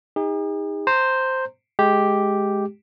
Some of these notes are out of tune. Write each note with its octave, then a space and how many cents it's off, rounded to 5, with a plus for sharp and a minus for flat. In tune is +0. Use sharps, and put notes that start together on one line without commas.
D#4 +15 G#4 -45
C5 +0 A#5 -20
G#3 +10 G4 +0